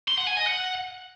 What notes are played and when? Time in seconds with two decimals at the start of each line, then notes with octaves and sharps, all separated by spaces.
0.08 C6
0.18 F#5
0.27 G#5
0.37 D#5
0.47 F#5